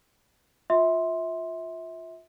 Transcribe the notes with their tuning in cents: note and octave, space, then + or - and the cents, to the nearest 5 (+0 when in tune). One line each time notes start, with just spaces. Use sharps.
F4 +20 E5 -25 C6 +0